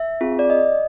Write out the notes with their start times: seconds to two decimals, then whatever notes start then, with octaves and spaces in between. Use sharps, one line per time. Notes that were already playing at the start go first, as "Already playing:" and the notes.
Already playing: E5
0.21 C4 F4 G#4
0.39 D5
0.50 D#5